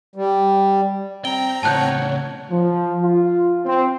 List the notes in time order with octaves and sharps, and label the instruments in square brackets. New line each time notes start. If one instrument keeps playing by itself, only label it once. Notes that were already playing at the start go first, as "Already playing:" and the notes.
[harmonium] G3
[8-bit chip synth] C4 A#5 [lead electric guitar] G5 [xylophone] G7
[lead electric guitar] A2 C#3 [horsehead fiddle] C#5 F#5 [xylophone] A5 F#6 G6
[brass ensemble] F3
F4
C4